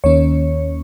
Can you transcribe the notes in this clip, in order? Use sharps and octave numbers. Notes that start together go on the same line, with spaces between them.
D#2 D#3 A#3 C#4 C#5